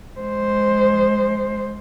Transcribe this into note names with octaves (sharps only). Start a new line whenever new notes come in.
G#3 C5